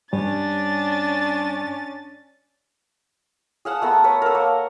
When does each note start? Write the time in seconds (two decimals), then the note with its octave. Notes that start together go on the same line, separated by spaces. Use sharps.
0.13 G2 G3 C#4 D4 A6
3.65 G#4 F5 F#5 A5
3.82 A3 B3 A5 A#5
4.04 B4 C#5 F#5
4.22 A4 A#4
4.35 A#3